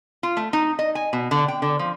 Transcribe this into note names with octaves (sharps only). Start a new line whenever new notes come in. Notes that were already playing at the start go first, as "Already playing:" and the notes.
F4
A3
D#4
D#5
G#5
B2
D3
G5
D3
F3